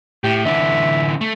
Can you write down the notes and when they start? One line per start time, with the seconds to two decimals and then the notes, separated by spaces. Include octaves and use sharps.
0.24 A2 G4
0.45 D3 E3 E5
1.21 A3